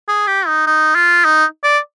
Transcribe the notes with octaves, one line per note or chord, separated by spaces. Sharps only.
G#4
G4
D#4
D#4
F4
D#4
D5